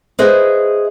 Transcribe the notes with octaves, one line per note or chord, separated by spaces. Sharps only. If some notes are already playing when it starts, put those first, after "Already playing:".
G#4 B4 C5 D#5 E5